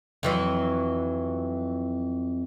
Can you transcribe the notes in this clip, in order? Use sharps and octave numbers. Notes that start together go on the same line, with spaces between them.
F2 E3 F#3